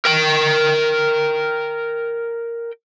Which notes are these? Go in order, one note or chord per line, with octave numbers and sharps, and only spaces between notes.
A#4 G5